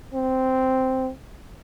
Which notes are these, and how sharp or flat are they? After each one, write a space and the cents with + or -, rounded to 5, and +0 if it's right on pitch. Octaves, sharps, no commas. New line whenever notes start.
C4 -5